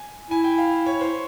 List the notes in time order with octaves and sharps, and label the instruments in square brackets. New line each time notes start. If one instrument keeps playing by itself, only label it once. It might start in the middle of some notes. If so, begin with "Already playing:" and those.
Already playing: [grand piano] G#5
[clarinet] E4 [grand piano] G#5
[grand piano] G5
F5
C#5
C5